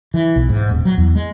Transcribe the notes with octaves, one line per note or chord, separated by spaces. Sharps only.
E3
B1
G#2
D#1
F#3
E2
G#3